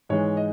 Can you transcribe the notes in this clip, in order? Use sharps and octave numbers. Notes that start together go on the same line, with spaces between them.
G#2 E3 G#3 C#5
D#5